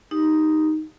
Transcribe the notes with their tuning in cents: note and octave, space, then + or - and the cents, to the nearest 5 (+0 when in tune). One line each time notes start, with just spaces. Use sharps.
D#4 +0 G4 +0